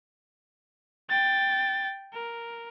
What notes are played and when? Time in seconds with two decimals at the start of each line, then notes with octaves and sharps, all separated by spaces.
1.09 G5 A6
2.13 A#4